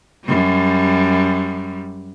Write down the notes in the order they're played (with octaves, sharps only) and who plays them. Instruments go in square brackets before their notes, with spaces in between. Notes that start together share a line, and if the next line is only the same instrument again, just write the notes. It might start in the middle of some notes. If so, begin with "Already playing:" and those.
[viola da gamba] F#2 G3